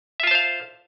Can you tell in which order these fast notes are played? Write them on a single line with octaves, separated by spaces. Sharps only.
E5 F4 A5 C5 F5